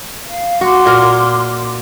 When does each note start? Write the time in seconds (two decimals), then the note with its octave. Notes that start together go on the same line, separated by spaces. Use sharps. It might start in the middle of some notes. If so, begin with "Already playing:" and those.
0.24 F5
0.61 F#4 C6 D6
0.86 A#2 A#4